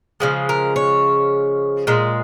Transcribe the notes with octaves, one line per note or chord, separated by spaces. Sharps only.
C#3 F3 G#3
A#4
C#5
A#2 G#3